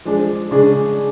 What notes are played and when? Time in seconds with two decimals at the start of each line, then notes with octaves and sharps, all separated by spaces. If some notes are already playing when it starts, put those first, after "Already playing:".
0.05 F3 G#3 D4
0.51 C#3 G#3 D4 G#4